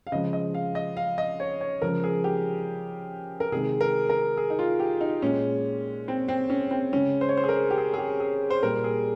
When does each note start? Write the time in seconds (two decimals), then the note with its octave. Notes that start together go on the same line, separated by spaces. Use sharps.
0.07 F5
0.12 C#3 F3 G#3 D#5
0.33 D#5
0.54 F5
0.75 D#5
0.97 F5
1.18 D#5
1.40 C#5
1.61 C#5
1.82 C#3 F3 G#3 A#4
2.04 G#4
2.24 G4
3.40 A#4
3.52 C3 D#3 G#3 G#4
3.81 A#4
4.09 A#4
4.37 G#4
4.50 D#4
4.59 F4
4.80 G4
5.01 D#4
5.22 A#2 G#3 C#4
6.08 C4
6.28 C4
6.50 C#4
6.71 C4
6.92 C#3 G#3 C#4
7.21 C5
7.29 C#5
7.37 C5
7.44 G#4
7.49 A#4
7.70 G4
7.78 G#4
7.94 G#4
7.98 G4
8.20 G#4
8.50 C5
8.63 A#2 G3 A#4
8.84 G#4